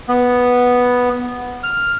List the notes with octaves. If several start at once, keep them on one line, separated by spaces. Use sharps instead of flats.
B3
F6